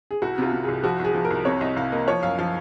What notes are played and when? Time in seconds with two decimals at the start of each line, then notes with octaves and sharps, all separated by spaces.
0.11 G#4
0.22 C2 F#4
0.38 C3 F4
0.53 C3
0.64 C2 G#4
0.83 F3 F#4
1.00 C2 G#4
1.15 F3
1.25 A#4
1.31 C2
1.45 C3 C#5
1.61 C2 D#5
1.76 C2 F5
1.92 A#3 D#5
2.08 F3 C#5
2.23 F#2 F5
2.39 F3 F5